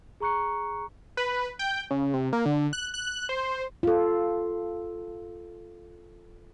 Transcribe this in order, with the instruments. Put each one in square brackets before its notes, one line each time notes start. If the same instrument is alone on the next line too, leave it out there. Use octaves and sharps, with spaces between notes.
[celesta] G#4 A#5 C#6 F#6 C#7
[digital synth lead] B4
G5
C#3
C3
A#3
D3
F#6
F#6
C5
[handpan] F4 A4